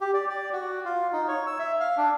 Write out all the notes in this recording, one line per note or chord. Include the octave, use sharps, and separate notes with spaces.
G4
D5
D5
F#4
F4
D#4
C#5
E6
E5
F5
D4